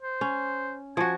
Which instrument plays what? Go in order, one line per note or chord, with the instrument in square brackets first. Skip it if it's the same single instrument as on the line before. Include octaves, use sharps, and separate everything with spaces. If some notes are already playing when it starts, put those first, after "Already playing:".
[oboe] C5
[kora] C#4
[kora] F3 F#4 [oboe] G#5